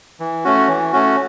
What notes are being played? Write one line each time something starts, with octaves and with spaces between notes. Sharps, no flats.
E3
A3 C#4 F#4
E3
A3 C#4 F#4